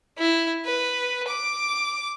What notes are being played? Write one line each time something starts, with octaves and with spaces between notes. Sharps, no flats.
E4
B4
D6